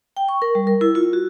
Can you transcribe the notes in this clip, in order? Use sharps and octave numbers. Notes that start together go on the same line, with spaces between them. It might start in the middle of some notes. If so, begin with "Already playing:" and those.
G5
C#6
A#4
G3
A#4
E4
F4
F#4